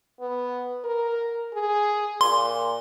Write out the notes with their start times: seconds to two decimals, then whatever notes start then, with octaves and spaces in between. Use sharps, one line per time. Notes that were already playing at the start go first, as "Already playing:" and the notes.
0.21 B3
0.85 A#4
1.54 G#4
2.21 A#2 C6